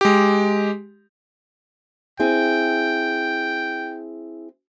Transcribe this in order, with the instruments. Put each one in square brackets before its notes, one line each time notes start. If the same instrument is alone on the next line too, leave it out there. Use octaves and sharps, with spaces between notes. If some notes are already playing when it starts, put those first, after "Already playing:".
[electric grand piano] G#3 G4
[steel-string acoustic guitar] C4 E4 G#4 [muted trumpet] G5